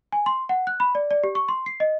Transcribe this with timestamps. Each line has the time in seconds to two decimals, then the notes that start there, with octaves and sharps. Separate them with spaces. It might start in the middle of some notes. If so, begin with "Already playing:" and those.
0.12 G#5
0.26 C6
0.49 F#5
0.67 F#6
0.80 B5
0.95 D5
1.11 D5
1.24 G4
1.35 C#6
1.48 C6
1.66 C7
1.80 D#5